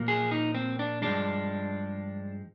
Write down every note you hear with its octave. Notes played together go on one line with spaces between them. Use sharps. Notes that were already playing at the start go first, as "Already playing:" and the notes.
Already playing: A#2 F3 A#3
G#4
D#4
C4
D4
G2 F3 G#3 D4